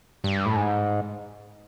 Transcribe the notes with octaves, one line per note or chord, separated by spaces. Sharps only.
G2
A2
G#2